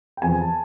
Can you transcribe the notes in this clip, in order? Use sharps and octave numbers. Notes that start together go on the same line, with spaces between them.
G5
E2 C3 F3 G#5
A5